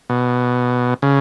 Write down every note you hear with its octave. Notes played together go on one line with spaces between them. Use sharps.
B2
C#3